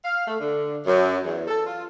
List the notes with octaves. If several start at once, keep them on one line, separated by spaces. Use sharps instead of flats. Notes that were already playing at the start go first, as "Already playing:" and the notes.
F5
A3
D3
F#2
E2
A4
F4